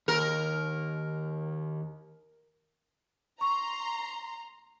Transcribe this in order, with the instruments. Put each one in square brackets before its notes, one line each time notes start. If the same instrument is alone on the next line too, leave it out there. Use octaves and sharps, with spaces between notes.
[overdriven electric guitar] D#2 [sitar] A#4
[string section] A#5 C6 [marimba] C#6